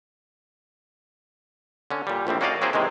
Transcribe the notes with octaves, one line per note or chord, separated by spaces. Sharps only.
D3 C#4
A#2 G3
A#1 A2 G3 C4
A#3 C#4 F#4 D5 D#5 F5
F#3 A#3 C4 E4 G#4 C5
G#2 C3 D#3 E3 G#3